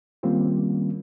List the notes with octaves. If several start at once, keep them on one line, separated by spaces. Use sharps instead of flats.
D#3 G3 A#3 C4 C#4 F4